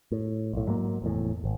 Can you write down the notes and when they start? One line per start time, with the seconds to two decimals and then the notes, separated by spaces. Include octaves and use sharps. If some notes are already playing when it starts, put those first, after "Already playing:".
0.12 A2
0.53 B1 A2
0.67 G#2 F#3 G3 A#3
1.02 F1 E2 A2
1.44 G#1